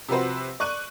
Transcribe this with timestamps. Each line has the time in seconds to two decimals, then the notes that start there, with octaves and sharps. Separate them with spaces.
0.09 C3 F3 C4 F#4 B4 C5
0.60 D5 C#6 F#6 D#7